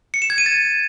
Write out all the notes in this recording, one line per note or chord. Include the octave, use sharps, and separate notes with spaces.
C#7
E7
G#6
D#7
A6